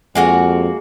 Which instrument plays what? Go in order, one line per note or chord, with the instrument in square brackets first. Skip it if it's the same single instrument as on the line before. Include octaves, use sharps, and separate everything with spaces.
[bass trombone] F2 [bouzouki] G#3 A#3 F#4